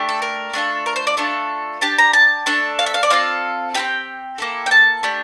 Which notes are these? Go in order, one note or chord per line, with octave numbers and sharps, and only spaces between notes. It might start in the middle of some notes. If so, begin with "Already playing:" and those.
Already playing: A3 D4 G4
A4
A#4
A3 D4 F4 A4
A#4
C5
D5
A3 D4 F4 A4
D4 G4 A5
A#5
A5
A3 D4 A4
F5
E5
F5
D5
C4 F4 A4 F5
C4 E4 G4 G5
A#3 E4 A4
G5
A5
A3 D4 G4